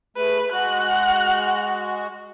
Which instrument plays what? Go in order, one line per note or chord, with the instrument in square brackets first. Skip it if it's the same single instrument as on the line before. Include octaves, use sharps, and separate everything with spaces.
[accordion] A3 [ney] G#4 [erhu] B4
[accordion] G#3 F#4 [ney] F#5 [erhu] F#6